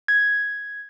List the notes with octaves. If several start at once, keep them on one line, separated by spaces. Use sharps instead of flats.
G#6